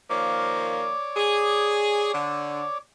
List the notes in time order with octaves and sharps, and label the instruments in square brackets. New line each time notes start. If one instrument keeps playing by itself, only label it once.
[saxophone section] D#3 F3 A#3 [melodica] C#5 D5 D6
[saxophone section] G#4
D3